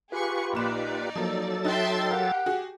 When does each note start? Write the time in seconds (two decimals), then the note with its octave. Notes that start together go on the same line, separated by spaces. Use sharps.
0.12 F4 G4 G#4 B4 C#6
0.53 A#1 A#2 D#4 D5 E7
1.15 F3 F#3 A#3 A4 A6
1.65 D#4 E5 G5 C6 F#6
2.10 G4 A#4 F5 F#5
2.46 F#4 G#4